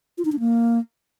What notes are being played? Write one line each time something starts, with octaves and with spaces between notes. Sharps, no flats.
F4
D#4
D4
A#3